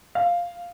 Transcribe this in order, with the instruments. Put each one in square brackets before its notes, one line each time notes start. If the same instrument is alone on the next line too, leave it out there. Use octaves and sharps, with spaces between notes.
[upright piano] F5